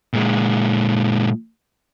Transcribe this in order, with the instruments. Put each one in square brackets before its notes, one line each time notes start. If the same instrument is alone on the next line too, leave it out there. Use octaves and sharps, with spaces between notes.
[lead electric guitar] A#2 G#3